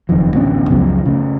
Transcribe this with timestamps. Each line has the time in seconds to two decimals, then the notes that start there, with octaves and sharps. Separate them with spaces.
0.09 F#1 F2 D#3 F3
0.33 A1 D2 B3 C#4
0.68 C#2 F#2 C#3 F3
1.05 C#3 A3